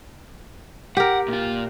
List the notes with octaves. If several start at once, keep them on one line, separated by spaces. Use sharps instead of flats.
G4 A#4 F#5
A#2 F4